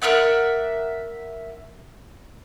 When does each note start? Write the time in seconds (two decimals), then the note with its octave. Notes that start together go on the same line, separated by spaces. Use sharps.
0.02 A#4 D5 E5 F#5